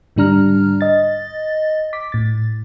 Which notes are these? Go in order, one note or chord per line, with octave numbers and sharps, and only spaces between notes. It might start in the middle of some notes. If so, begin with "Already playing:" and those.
G#2 D3 G3 D4 A#5 F6
D#5 A6
D6 B6
A2 A6